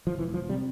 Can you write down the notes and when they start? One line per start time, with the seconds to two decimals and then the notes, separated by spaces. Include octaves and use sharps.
0.07 F3
0.18 E1 E3
0.34 F3
0.49 C3 G3